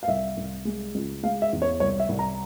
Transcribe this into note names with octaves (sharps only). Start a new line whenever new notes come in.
F5
C2 E5
C2
G#3
C#2
G#3 F5
E5
E2
C#5
C2 C#5
E5
C2
A#5